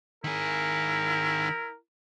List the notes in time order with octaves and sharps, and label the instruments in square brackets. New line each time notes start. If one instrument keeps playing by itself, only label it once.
[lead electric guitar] D#3 G#4 [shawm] E4 [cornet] A#4